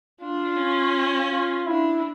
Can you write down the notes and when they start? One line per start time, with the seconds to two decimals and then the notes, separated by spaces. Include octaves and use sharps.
0.21 D4 F4
0.57 C#4
1.31 F4
1.67 D4 E4